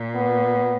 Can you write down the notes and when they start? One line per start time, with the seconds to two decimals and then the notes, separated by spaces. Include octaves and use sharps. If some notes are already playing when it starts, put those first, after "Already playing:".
Already playing: A#2
0.15 B3